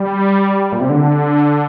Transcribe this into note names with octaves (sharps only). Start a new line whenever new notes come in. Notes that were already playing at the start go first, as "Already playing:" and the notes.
Already playing: G3
A#2
C3
D3